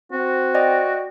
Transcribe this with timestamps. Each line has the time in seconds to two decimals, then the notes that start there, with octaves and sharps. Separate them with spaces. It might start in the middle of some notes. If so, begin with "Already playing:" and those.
0.12 C4 F#4
0.55 D5 D#5 G5